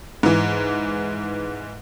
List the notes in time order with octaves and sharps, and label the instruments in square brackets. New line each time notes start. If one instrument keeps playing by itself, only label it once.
[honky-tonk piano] G#2 E3